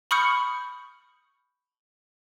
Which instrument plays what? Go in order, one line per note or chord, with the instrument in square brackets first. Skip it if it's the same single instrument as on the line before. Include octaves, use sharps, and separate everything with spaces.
[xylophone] B5 C#6 D#6 F6 G6 C#7